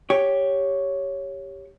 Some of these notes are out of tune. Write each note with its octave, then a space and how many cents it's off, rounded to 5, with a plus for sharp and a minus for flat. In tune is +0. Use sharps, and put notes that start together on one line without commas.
G4 +0 C#5 +0